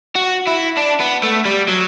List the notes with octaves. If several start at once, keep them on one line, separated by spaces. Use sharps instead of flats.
F#4
E4
D4
B3
A3
G3
F#3